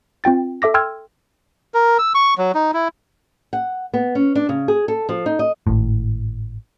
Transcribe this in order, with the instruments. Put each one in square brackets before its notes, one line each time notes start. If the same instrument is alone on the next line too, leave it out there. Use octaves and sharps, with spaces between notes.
[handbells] C4 F4 G5 A6
A4 E5 D6 A#6
G5 C6 E6 F6 G#6
[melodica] A#4
E6
C#6
F#3
D#4
E4
[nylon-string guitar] F#5
B3
C#4
D4
C#3
G#4
A4
F3
D#4
D#5
[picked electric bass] G#1 A2